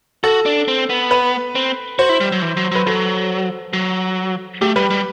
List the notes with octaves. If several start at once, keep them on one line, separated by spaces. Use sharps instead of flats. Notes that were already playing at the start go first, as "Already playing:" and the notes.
F#4 A4
D4
C4
B3
B4
C4
F#4 C5
E4
G3
F#3
E3
F#3
F#3 B4
F#3 A4
F#3
A3 G4
G3 B4
G3